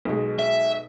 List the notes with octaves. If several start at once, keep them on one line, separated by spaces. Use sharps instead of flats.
B1 B2 G#3
E5